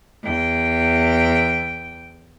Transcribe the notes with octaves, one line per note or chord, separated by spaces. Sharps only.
E2 G5